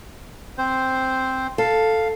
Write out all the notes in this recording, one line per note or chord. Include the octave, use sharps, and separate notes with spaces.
C4 C5
A4 F5